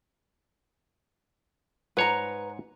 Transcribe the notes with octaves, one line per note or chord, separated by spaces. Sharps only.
G#2 B4 C#5 A#5